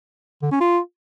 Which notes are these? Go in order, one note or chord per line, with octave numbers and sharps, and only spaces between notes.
D3
C#4
F4